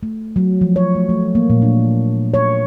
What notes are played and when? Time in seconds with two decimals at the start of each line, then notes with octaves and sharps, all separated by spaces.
0.03 A3
0.36 F#3
0.61 F3
0.76 C#5
0.95 A3
1.09 A3
1.35 A#3
1.50 A#2
1.62 D4
2.34 C#5